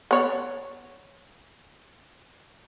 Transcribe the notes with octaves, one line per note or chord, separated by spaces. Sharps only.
B3 C#5 D5